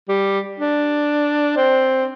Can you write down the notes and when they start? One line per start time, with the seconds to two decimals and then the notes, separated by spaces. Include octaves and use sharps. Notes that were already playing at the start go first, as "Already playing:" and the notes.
0.09 G3
0.60 D4
1.57 C4